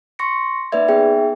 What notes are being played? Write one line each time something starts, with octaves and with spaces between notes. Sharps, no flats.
C6 C#6 A#6 C#7
A#3 D#4 B4 D5 E5 G#6
B3 D#4 G#4 E5 G5